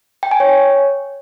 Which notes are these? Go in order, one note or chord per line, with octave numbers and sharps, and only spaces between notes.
G5
G#5
C#5